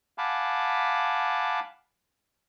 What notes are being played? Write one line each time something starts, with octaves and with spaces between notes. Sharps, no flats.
F5 F#5 G#5 A5 B5 D6